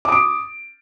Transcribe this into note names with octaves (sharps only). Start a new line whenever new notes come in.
D6 D#6 D7